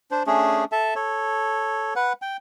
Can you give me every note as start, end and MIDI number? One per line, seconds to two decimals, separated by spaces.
0.11 0.23 62
0.11 0.23 72
0.27 0.65 57
0.27 0.65 61
0.27 0.65 62
0.27 0.65 68
0.72 0.94 69
0.72 0.94 76
0.72 0.94 81
0.95 1.94 69
0.95 1.94 73
1.96 2.13 71
1.96 2.13 78
2.22 2.37 79